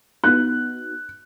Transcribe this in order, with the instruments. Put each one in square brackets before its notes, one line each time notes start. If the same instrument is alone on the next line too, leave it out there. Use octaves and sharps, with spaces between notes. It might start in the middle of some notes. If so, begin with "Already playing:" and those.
[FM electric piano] B3 D#4 F#4 [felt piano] F#6